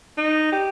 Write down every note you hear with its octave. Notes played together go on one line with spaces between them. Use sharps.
D#4
G4